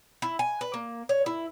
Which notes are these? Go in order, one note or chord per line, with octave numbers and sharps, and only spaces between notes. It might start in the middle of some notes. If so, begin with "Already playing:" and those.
E4
G#5
B4
A#3
C#5
E4